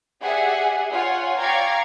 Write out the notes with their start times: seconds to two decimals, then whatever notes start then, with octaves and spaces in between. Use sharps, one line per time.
0.22 G4 G#4 D5 E5 F#5 G#5
0.91 F4 C#5 F#5 G#5
1.40 D5 F5 G5 A#5 C#6 G#6